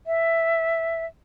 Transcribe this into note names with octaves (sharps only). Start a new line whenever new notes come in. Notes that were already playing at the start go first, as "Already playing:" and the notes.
E5